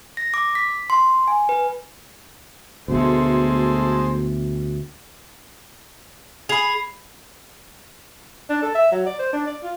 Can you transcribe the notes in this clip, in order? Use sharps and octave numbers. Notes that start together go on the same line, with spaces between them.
A#6
D6
B6
C6
G#5
B4
D2 B2 G#3 A3 A4 C5
G#4 B5 C7 F7
D4
A4
E5
F#3
D5
C5
D4
D5
F4